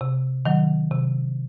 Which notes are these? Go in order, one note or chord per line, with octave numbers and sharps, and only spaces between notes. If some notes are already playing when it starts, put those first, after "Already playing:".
C3
D#3 F#3
C3